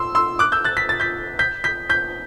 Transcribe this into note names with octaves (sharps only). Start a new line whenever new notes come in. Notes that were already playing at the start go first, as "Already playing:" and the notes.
Already playing: C6 E6
C6 E6
D6 F#6
E6 G6
F#6 A6
B6
A6
G6 B6
G6 B6
G6 B6
G6 B6